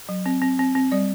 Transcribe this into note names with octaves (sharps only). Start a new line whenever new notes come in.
F#3
C4
C4
C4
C4
G3 D5